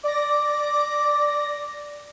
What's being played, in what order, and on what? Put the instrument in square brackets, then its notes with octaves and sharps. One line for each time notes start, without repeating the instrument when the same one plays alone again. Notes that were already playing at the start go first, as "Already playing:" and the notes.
[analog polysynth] D5 A#6 [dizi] D6